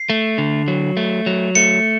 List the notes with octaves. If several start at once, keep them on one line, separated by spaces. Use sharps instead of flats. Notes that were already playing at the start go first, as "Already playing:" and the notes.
Already playing: C7
A3
D3
F#3
A3
F#3
A3 C#7